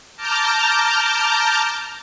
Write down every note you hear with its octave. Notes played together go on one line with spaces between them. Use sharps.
A5 A#5 D6 F6 G6